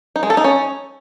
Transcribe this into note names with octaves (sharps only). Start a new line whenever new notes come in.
D#4
G#3
A4
D#4
C#4